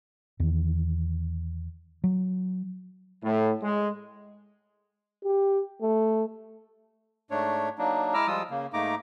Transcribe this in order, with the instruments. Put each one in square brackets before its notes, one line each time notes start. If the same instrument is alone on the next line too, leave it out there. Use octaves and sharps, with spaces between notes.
[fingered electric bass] E2 D#3 E3
F#3
[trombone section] A2
G#3
[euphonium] G4
A3
[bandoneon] G#2 A3 D4 C#5
F#3 A#3 D4 D#4
G#3 E4 A#5 D6 E6 F6
F3 G3 G#3 F4 D#6 E6
C#3 A#3
G#2 A3 A#3 D#4 A#5 D6